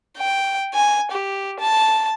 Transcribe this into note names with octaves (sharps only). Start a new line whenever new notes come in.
G5
G#5
G4
A5